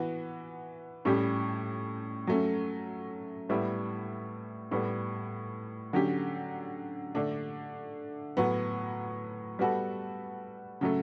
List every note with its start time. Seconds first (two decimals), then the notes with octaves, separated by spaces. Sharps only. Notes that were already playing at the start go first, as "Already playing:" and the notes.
Already playing: E3 B3 F#4
1.05 A2 G3 C#4 G4
2.27 F#3 A3 C#4
3.49 A2 G3 B3 E4
4.71 A2 G3 B3
5.93 D3 F#3 C#4 G4
7.15 D3 A3 D4
8.37 A2 F#3 B3
9.59 G3 B3 F#4 A4
10.81 C#3 F#3 A3